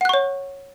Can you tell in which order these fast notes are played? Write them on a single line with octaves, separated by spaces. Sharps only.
F#5 F#6 C#6 C#5